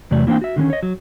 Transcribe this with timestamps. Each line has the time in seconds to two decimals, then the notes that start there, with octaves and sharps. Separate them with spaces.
0.11 E2 C3 F#3 A3 D5
0.27 E3 A#3 C4 D4 G5
0.41 F#4 E5
0.56 D3 D#3 B3 C#4
0.70 C#5 D#5
0.83 F#3